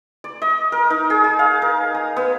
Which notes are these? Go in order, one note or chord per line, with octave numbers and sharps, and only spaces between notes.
D5
D#5
A#4
D#4
G#4
G#4
F5
A#4
D#6
B3